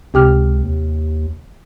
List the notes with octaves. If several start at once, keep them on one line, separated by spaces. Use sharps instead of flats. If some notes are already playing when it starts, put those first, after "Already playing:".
C#2 C3 G4 F6
D#2